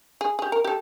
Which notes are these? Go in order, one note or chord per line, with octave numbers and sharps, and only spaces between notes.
G#4
G4 G#4
A#4
G4 A4